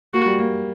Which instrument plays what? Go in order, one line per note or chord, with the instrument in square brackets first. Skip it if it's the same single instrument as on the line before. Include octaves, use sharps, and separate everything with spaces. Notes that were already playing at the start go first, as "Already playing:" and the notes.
[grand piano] A#3 [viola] F#4
[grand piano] G3
A#3